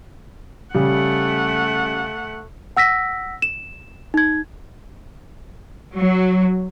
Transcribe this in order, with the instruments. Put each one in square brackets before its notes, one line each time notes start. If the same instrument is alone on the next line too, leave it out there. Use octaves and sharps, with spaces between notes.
[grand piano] C#3 G3 [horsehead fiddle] A3 F#5
[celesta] F#5 E6 A#6 B6
E7
D#4 G#6
[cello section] F#3